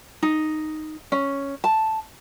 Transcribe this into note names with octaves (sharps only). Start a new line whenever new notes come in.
D#4
C#4
A5